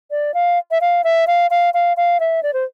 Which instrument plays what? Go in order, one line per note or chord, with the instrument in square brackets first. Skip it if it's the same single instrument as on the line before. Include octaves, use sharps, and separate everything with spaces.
[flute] D5
F5
E5
F5
E5
F5
F5
F5
F5
E5
D5
C5